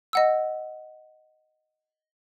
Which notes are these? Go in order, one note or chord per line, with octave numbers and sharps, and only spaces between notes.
D#5 F#5 E6